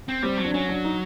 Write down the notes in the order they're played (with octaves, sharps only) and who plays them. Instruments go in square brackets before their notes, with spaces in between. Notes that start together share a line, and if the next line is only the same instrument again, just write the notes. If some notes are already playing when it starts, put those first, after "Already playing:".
[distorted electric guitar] C4
[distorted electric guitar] G3 [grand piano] C4
[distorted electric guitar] F#3
[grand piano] D4
[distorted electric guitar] F#3 [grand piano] C#4
[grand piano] D4
D#4